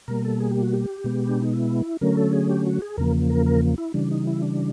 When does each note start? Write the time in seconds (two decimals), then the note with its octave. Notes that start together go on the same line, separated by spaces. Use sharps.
0.08 B2 G3 A#3 A#4
0.25 A4
0.40 G#4
0.51 G4
0.63 F#4
0.73 G4
1.04 B2 G#3 B3
1.29 D4
1.41 D#4
1.53 E4
2.01 D3 F#3 A3 C#4 A#4
2.17 A4
2.33 G#4
2.49 G4
2.66 F#4
2.82 G#4
2.97 E2 C#3 F3 A#3 A#4
3.30 A#4
3.46 A#4
3.78 E4
3.94 C#3 E3 G3 D4
4.11 D#4
4.27 E4
4.42 D4